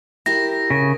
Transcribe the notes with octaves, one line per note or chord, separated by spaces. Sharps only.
E4 G4 A#4 A#6
C#3